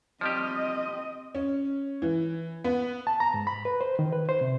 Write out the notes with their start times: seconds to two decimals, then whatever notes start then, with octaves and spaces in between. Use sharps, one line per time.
0.21 F3 G3 C4 G4 D#5
1.35 C#4
2.02 E3
2.64 B3
3.07 A5
3.20 A#5
3.34 G#2
3.47 B5
3.65 B4
3.81 C5
3.99 D#3
4.12 B4
4.29 C5
4.41 C3